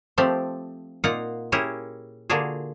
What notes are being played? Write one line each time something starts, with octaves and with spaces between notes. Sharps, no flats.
F3 A3 C4 G4 D5
A#2 A#3 D#4 F4 F#5
C#4 E4 G4 G#4 A#4
D3 A#3 D4 F4 F#4 G#4